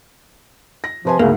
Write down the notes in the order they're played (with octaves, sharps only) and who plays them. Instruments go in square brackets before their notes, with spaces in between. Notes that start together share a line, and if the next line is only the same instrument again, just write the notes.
[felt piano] A#6
[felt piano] C3 B4 G#5 [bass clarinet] F3
[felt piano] D2 G#2 [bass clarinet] C#3 [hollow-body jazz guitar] A#3